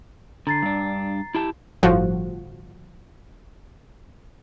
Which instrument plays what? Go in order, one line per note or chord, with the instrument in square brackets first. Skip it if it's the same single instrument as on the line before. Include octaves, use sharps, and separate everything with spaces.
[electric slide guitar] D3 [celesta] A#5 A6 C7
[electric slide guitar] G2 D4
E4 G4 A5
[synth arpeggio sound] G1 A2 F3 F#4